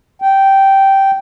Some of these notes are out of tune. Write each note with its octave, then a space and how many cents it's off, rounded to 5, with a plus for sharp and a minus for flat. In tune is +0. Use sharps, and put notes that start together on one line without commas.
G5 -10